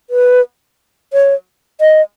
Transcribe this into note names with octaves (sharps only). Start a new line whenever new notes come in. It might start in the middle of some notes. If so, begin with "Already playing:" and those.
B4
C#5
D#5